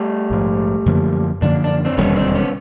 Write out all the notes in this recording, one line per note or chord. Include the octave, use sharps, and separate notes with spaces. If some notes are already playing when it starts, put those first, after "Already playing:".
Already playing: G3 A3
A#1 G#2 F3
F#2 D3 F3 A#3
F#2 D3 F3 A#3 D4
D4
C4 D4
E1 D#2 D3 G3 B3 C#4
C4 D4
B3 C#4